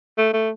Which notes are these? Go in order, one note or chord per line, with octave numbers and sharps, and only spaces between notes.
A3
A3